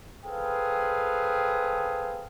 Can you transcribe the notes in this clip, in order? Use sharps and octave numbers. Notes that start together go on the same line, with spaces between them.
G#4 A4 B4 C5 F5 G5